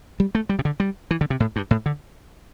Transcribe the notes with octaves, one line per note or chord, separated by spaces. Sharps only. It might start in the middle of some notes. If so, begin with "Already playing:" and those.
G3
A3
G3
C3
D3
G3
E3
D3
C3
A2
G2
A2
D3